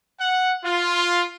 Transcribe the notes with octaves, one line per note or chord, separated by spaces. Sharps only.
F#5
F4